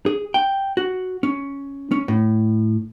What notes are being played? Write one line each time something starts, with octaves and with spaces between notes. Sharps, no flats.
G#4
G5
F#4
C#4
C#4
A2